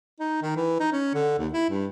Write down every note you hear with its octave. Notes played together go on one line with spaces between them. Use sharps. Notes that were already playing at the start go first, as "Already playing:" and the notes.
D#4
D#3
E3
D#4
C#4
D3
D#2
E4
G2